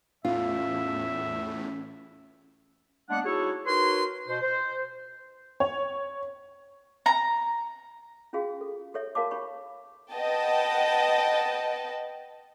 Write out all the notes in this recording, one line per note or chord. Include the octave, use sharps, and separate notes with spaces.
E2 A2 C#4 F4 E5
G#3 A#3 B3 D4 D5 F#5
D#4 E4 F#4 G#4 A4 C#5
D#4 F#4 A#4 B4 C#5 C6
B2 C5
C5
C#5
A#5
C#4 F4 F#4 G#4 F5
A4
G4 A4 C#5 E5
F#4 A#4 F5 A5 D6
D#4 G4 C#5 B5 C#6
B4 D#5 F#5 G5 A5